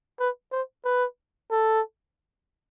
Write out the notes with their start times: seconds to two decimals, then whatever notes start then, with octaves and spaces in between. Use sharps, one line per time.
0.19 B4
0.52 C5
0.85 B4
1.51 A4